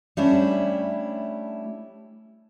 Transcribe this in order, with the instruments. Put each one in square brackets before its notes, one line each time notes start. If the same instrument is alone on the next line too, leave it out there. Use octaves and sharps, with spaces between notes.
[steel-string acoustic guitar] G3 A3 C#4 D4 E4